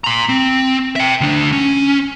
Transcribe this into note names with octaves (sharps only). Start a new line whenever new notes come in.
A#5 C6
C4
E5 G5
D2 D4
C#4